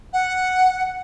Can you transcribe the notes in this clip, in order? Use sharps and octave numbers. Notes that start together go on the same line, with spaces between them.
F#5